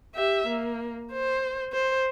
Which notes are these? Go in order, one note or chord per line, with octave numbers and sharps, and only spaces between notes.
G4 E5
A#3
C5
C5